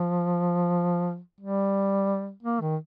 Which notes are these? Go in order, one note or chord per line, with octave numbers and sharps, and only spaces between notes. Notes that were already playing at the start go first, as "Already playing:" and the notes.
Already playing: F3
G3
A#3
D#3